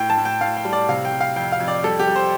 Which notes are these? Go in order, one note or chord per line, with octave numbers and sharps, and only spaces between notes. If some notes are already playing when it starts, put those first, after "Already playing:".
Already playing: A2 G5
A5
A2
G5
A2 F5
G5
G3
D5
C3 F5
G5
C3
F5
F2 G5
F5
F2
D5
G3 A4
G4
G3
C5